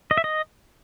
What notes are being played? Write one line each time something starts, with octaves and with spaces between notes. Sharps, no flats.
D#5
E5
D#5